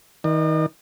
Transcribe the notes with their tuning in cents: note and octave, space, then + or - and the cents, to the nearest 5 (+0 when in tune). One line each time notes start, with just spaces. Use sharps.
D#3 +35 D#5 -45